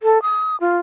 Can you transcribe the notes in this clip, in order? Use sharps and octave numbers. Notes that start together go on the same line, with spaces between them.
A4
D#6
F4